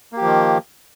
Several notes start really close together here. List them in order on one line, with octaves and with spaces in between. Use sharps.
A#3 G4 F3 D#3